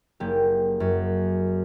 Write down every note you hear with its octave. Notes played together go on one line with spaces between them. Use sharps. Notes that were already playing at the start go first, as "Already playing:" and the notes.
F#1 A#3 G4
F#2